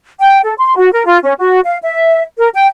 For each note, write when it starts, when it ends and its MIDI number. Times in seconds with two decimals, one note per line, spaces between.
0.20 0.39 79
0.44 0.54 69
0.58 0.75 84
0.77 0.92 66
0.93 1.05 70
1.06 1.18 65
1.23 1.33 61
1.38 1.60 66
1.65 1.77 77
1.82 2.22 76
2.38 2.49 70
2.54 2.66 79